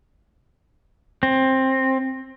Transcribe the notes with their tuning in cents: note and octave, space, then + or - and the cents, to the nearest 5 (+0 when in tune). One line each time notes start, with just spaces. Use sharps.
C4 +15